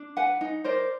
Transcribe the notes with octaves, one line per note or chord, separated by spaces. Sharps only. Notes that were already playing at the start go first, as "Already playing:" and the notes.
Already playing: D4
B4 F#5 G#5
D#4
A#4 C5 D5